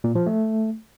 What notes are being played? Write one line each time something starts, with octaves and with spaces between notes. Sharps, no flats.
A#2
F3
A3